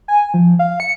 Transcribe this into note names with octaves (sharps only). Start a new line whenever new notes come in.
G#5
F3
F5
C#7